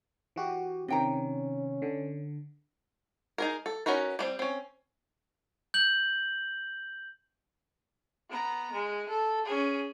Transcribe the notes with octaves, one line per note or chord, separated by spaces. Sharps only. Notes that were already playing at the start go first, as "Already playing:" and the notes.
E3 F#4 G4
C3 D#3 C#4 D4 G5 A#5
D3
D#4 G#4 A#4
A4
C#4 D#4 F#4 A#4 B4
G3 A3 C4
C4 C#4
G6 F#7
B3 A#5
G#3
A4
C#4 G#4